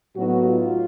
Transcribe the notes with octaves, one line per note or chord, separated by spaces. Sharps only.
A2 F#3 B3 D#4 F#4
F4